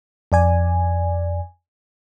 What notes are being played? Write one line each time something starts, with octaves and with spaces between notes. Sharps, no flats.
F2 D5 G#5